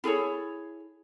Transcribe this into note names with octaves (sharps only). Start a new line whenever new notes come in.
E4 G#4 A4 C#5